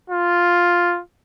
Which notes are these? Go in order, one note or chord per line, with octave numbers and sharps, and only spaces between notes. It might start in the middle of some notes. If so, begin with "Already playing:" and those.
F4